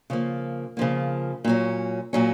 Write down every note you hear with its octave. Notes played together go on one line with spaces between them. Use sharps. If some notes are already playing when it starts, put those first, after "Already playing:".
C#3 F3 A#3
C#3 F3 A#3
A#2 F#3 C#4
A#2 F#3 C#4